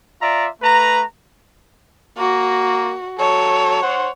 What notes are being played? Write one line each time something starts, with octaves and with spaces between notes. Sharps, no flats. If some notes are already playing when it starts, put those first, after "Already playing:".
F4 D5 E5 A#5
A3 B4 A#5
A#3 F#4
F#3 A4 C#5
C5 F#5